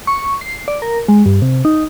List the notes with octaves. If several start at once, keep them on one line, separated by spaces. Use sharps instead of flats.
C#6
C7
D5
A#4
G#3
G2
C3
D#4